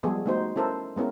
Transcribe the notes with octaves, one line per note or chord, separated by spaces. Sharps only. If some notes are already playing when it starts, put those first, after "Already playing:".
F3 G3 G#3 B3 G#4 A4
A3 B3 D#4 F#4 C5
C#4 E4 A4 A#4 C5
G#3 B3 C#4 E4 A#4